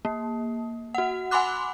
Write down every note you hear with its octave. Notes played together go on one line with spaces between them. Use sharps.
A#3
F#4 F#5
F#5 G#5 B5 C6 D6 F#6